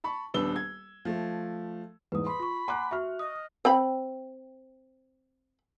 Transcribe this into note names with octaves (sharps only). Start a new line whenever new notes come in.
A5 B5 C#6
D#1 B3 D4 B4 E6 G7
G#6
F3 A3
E2 G#2 B4 D#6
B5 C6
F4 C#6
F#5 G#5 A#5 C6 D6 F#6
F#4 E5 C#6 F6
D#5 D#6
C4 G5 B5